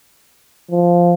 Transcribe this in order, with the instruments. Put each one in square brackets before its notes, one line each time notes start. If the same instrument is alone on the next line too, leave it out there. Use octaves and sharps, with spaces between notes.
[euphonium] F3